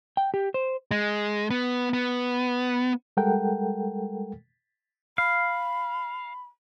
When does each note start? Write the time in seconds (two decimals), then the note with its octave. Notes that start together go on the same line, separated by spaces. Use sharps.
0.17 G5
0.34 G4
0.54 C5
0.91 G#3
1.50 B3
1.93 B3
3.17 G3 G#3 A4 A#4 F#5 G5
5.18 F5 B5